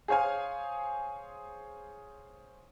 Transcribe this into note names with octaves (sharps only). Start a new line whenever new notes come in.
G#4 C5 C#5 F5 G#5